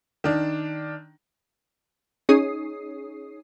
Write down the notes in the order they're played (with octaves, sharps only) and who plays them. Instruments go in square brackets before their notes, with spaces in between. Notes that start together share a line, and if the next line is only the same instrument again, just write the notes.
[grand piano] D#3 D4
[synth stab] C#4 D#4 G#4 C#5 D#6 C7